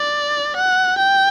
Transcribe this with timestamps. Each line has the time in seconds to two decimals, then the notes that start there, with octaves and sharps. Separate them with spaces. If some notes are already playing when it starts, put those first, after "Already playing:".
Already playing: D5
0.56 F#5
0.98 G5